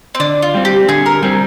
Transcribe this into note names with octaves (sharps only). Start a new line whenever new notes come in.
C4
D3 D4
F4
G3 C4
G4
D3 G#4
A#4
G3 C4 G#4